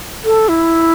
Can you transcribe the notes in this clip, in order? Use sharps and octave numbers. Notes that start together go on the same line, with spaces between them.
A4
E4